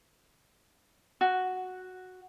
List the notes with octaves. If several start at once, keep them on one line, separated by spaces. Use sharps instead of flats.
F#4